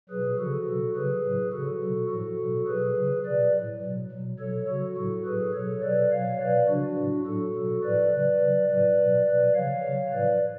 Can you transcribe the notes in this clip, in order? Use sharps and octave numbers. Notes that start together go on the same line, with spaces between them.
B2 F#3 G#4 B4
C#3 F3 F#4 A4
B2 F#3
C#3 F#3 G#4 B4
A2 F#3
C#3 F#3 F#4 A4
B2 F#3
A2 F3 F#4 A4
B2 F#3
B2 F#3 G#4 B4
C#3 F#3
B2 F#3 B4 D5
A2 F#3
B2 F#3
B2 F#3
B2 F#3 A4 C#5
C#3 F#3 F#4 A4
A2 F#3 F#4 A4
A2 F#3 G#4 B4
B2 F#3 A4 C#5
B2 F#3 B4 D5
B2 F#3 C#5 F5
B2 F#3 B4 D5
C#3 F3 D4 F#4
A2 F#3
A2 F#3 F#4 A4
B2 F#3
A2 F3 B4 D5
C#3 F#3 B4 D5
C#3 F#3
A2 F#3 B4 D5
B2 F#3
B2 F#3 B4 D5
C#3 F3 C#5 F5
C#3 F#3
A2 F3 B4 D5